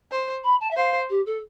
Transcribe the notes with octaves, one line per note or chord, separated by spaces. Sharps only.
C5
B5
A5
E5
C5 F5
G4
A4